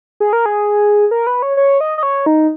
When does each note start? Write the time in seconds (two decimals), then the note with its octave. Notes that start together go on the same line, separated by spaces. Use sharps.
0.20 G#4
0.33 A#4
0.46 G#4
1.11 A#4
1.27 B4
1.42 C#5
1.57 C#5
1.81 D#5
1.98 D#5
2.03 C#5
2.26 D#4